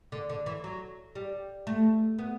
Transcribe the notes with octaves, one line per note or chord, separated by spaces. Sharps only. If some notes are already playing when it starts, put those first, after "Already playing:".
D3
D3
E3
F#3
G3
A3
B3